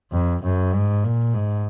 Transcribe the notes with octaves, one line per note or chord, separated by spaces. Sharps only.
F2
F#2
G#2
A#2
G#2